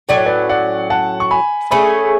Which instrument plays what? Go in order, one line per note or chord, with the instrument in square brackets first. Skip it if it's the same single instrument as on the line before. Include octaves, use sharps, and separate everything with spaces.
[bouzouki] A2 F#3 C#4 [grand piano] D5
[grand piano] C#5
B4 D5
D5 F#5
F#5 A5
C#6
G#5 B5
[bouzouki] A3 C#4 G#4 [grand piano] G#5 B5